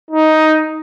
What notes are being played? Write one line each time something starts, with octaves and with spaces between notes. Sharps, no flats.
D#4